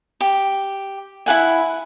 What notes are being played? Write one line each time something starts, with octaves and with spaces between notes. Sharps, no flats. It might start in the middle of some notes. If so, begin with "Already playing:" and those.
G4
E4 G#4 F#5 G#5